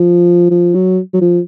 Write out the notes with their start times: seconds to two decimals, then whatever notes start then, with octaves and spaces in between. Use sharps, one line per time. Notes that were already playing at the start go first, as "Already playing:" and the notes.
Already playing: F3
0.51 F3
0.75 F#3
1.13 F#3
1.21 F3